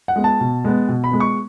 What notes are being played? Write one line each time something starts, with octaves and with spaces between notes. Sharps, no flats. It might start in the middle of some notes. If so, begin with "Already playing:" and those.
F#5
G#3 B3
A5
B2
G#3 B3
B2
B5
G#3 B3
C#6